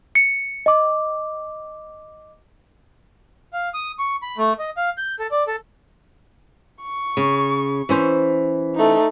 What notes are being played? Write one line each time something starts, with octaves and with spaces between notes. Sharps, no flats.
C#7
D#5 D6
F5
D#6
C#6
B5
A3
D#5
F5
G6
A4
D5
A4
C#6
C#3
E3 C#4 C5
A3 D#4